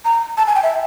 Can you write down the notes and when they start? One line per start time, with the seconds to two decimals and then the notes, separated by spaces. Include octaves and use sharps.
0.05 A#5
0.37 A5
0.47 G#5
0.55 G5
0.63 E5